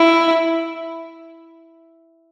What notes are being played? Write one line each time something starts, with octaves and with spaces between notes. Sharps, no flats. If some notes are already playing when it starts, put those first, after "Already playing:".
Already playing: E4